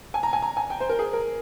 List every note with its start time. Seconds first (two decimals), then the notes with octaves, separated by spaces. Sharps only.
0.14 G#5
0.23 A#5
0.33 G#5
0.42 A#5
0.57 G#5
0.70 G5
0.80 C5
0.89 A#4
0.99 G#4
1.13 A#4